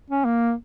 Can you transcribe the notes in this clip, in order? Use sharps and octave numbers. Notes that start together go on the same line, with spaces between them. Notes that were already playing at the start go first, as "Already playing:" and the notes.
C#4
A#3